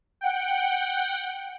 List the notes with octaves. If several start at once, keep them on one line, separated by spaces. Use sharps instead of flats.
F#5 G5